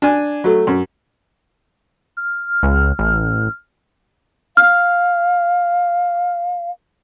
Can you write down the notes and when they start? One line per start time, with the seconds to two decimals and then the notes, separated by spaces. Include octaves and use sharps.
0.02 D4 G#5
0.44 F#3 A3
0.67 F#2
2.17 F6
2.63 C#2
2.99 A1
4.57 F5 F6